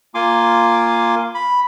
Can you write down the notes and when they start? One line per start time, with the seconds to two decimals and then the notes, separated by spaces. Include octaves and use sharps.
0.15 A#3 F4 G#5 C6 D6
1.34 B5